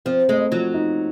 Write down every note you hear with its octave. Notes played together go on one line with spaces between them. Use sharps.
F3 C4
G#3 A3
F3 F#3
D#4